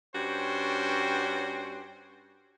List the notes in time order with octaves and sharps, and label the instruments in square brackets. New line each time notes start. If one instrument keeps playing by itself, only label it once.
[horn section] G2 C#4 F#4 C5 G5